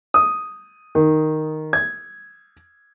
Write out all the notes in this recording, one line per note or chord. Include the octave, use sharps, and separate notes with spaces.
D#6
D#3
G#6